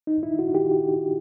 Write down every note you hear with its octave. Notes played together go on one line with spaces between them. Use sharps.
D#4
E4
F#4
G4